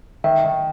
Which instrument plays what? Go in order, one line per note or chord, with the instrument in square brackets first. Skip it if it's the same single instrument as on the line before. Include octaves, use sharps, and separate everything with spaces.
[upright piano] D#3 [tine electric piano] E5
[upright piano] D#3